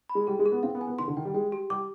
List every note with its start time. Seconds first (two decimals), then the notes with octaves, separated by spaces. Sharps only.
0.10 B5
0.15 G#3
0.27 G3 G#4
0.39 G#3
0.46 G#4
0.52 B3
0.63 C4 F5
0.75 B3
0.81 G#5
0.87 B3
0.99 D#3 C6
1.08 D3
1.17 D#3 G5
1.25 G3
1.34 G#3 G5
1.52 G4
1.70 G3 D6